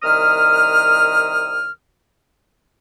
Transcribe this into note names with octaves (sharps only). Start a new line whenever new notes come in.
C2 D#3 D#6 F6